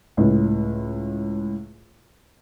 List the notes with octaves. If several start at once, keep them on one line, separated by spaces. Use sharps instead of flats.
C#2 A2